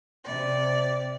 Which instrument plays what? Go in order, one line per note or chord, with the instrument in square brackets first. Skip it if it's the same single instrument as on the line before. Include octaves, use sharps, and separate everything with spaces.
[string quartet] C3 D5